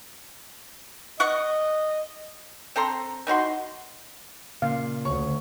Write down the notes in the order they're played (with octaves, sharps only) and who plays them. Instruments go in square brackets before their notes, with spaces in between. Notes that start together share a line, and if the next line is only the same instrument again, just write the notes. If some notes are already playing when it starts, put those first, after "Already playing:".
[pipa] B3 F#5 C#6 [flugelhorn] D#5
[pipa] C4 A4 A#5 C6
E3 D#4 F#4 C6
[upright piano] A#2 [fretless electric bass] C#3 [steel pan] F5
[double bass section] D2 [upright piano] C#5 C#6